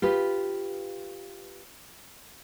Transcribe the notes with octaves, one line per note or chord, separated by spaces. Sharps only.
F4 G4 B4